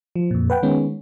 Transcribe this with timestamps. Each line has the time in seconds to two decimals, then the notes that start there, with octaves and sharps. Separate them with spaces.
0.16 F3
0.31 F2 A#2
0.50 B4 F#5 G5
0.63 D#3 G#3 B3 C#4